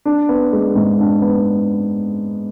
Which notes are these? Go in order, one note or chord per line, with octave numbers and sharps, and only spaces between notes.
D4
B3
G#3
G#2
D4
B3